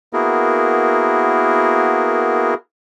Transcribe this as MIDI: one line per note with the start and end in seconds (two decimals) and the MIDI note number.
0.13 2.54 58
0.13 2.54 59
0.13 2.54 64
0.13 2.54 66
0.13 2.54 68
0.13 2.54 70